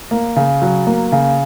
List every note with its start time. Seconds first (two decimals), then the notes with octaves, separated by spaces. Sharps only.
0.11 A#3
0.36 C#3
0.62 F#3
0.87 A#3
1.12 C#3